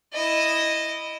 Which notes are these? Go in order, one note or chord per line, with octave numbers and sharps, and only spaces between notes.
E4 D#5